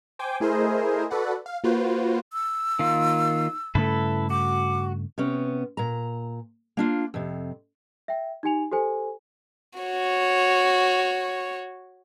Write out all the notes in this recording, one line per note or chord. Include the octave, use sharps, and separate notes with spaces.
C5 G5 G#5 D6
A3 E4 G#4 A#4 C5 D#5
F#4 A4 B4 D5 F#5
F5
A#3 F4 F#4 B4 C5
E6
D#3 A#3 F4
G2 C#3 A3 E4 A4 B4
F#4 D6
C3 B3 C#4
A#2 A#5
A#3 D4 F4
F2 C3
E5 G5
D#4 G4 G#5 F7
G4 A4 C5 G#5
F#4 C#5